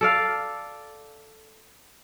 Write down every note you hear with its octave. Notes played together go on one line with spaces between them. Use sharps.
A4 D5 F5